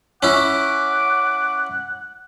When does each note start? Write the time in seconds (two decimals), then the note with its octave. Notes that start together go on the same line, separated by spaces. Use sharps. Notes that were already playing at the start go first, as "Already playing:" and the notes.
0.23 C#4 E4 F#5 D6